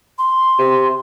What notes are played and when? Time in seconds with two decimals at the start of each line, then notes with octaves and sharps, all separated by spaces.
0.18 C6
0.59 C3